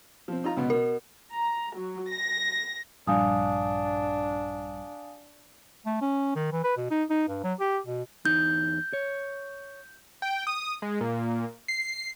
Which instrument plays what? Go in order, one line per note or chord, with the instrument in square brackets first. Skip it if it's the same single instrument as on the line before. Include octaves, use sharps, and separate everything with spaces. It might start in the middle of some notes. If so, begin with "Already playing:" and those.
[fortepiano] F3 C4
D#4 F4 A#5
C#2 B2 B3
[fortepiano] B2 [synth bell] A#4
[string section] A#5
F#3
A#6
[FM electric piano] A#1 G2 [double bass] D4 [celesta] F5 G#5 D#6
[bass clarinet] A3
C#4
D#3
E3
B4
B2
D#4
D#4
G2
F#3
G4
B2
[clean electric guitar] E2 D#4 [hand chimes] G6
[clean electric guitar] C#5
[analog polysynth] G5
D#6
G#3
A#2
C7